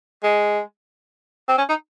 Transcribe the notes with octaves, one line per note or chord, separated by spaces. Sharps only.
G#3
C4
C#4
D#4